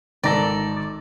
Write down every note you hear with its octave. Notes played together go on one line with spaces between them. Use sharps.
G#1 A4 D5 A#5 A#6